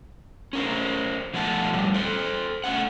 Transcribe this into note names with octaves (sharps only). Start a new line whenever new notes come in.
C#4 A#4 C5
B2 F3 A3 F#5 G#5 A5
F2 A2 G3
A4 C5
A3 C#4 F#5